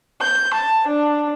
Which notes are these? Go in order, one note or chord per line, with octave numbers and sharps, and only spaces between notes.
G6
A5
D4